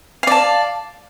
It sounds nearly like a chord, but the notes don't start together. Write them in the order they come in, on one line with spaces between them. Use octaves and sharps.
F5 D5 A5